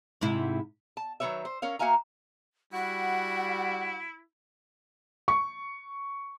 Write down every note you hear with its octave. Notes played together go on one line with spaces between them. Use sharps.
G#2 C3 E4
A5
D#3 F#3 C4 B4 C#5 E5
C5
C#4 A#4 C#5 F5
A#3 F#4 E5 F5 G#5 A#5
G3 E4 F#4 F#5
C#6